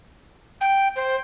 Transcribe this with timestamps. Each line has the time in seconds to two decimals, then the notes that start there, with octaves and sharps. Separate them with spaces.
0.60 G5
0.96 C5